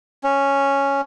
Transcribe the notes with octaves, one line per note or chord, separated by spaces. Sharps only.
C#4